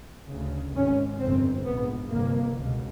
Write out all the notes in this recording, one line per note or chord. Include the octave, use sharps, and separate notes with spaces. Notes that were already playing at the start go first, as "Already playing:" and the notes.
D2 C#3
G#1 G#2 C#4
G1 F2 C3 C4
A#1 G#2 B3
G1 F2 C3 A#3
C#2 B2